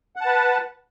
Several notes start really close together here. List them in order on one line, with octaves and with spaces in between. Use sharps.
F#5 A5 B4